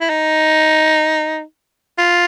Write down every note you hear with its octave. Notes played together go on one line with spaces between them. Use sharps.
E4
D#4
F4